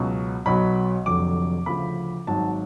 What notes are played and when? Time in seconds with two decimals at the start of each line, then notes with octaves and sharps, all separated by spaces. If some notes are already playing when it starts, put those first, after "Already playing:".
Already playing: C#2 B2 F#3
0.46 B1 B2 F#3 B5
1.06 F1 F2 D3 F#3 D6
1.66 D2 C#3 F3 B5
2.27 G#1 G#2 F#3 A5